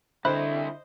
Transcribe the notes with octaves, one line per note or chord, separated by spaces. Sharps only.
C2 D3 E4 C5 D#5 E5 B5 F#6